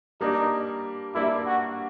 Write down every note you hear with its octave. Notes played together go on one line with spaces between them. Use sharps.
G3 A#3 D4 D#4
G3 A#3 D4 E4
F#4